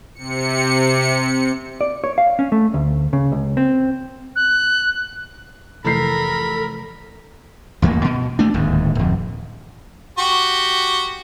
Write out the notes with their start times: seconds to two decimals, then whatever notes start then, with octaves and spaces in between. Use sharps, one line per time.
0.15 C3 C#7
1.81 D5
2.04 C#5
2.18 F5
2.39 C#4
2.52 A3
2.74 D2
3.13 C#3
3.32 C#2
3.57 C4
4.36 F#6
5.84 F1 E3 A4 A#4 B5 C7
7.82 A1 D#2 A#3
8.04 B2
8.39 A3 D4
8.54 D1 D#2 G#2
8.95 D1 F2
10.18 F#4 G4